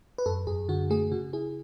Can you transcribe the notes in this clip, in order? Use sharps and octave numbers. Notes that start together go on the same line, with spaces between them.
B4
F#2 A4
F#2 G#4
D3 F#4
A3 G#4
C#3 F#4
E4 G#4